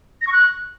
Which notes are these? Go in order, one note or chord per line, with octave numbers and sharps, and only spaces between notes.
A#6
C#6
F#6